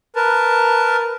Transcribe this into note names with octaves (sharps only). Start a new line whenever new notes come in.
A#4 B4 A5